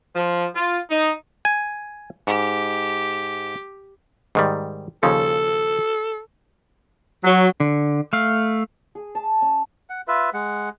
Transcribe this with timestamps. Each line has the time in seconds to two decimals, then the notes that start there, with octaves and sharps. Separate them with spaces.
0.15 F3
0.55 F4
0.90 D#4
1.45 G#5
2.27 G#2 G4
4.35 G#2 D#3 G3
5.03 D#2 C#3 F3 A4
7.24 F#3
7.60 D3
8.13 A3 F5
8.95 G#4
9.15 A5
9.42 C#4
9.90 F#5
10.08 F4 B4 E5
10.34 G#3 F#5